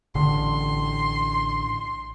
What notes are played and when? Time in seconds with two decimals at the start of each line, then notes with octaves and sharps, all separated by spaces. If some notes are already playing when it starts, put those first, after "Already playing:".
0.15 A1 D3 C6